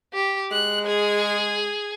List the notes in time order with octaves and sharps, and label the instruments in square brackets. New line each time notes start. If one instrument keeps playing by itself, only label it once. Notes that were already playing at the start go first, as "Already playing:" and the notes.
[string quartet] G4
[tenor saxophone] G#3 [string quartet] F#6
[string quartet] G#4